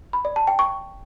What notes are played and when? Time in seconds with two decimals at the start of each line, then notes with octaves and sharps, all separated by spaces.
0.13 B5
0.25 D5
0.36 A5
0.47 G5
0.59 C#6